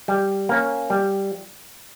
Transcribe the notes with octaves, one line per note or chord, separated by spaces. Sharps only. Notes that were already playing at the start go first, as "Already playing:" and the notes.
G3
A#3 C#4
G3